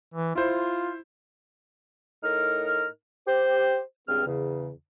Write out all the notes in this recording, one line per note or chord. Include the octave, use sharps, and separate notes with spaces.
E3
E4 F4 C5
A2 D#4 A#4 F6
G4 C5
C#2 G2 C4 G#4 F6
E2 C#3